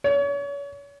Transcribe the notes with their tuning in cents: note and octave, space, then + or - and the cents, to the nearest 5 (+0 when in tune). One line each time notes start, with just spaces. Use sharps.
C#5 +35